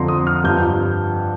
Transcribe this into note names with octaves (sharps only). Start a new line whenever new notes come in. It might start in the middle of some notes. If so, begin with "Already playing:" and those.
Already playing: F2 D3 F3 A#5 C6
D#6
F6
G2 F3 G6